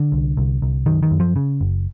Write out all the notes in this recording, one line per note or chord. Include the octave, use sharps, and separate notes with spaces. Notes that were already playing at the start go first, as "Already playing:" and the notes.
Already playing: D3
C2
C2
C2
F#2 D#3
D#3
F#2
F3
C#3
F#1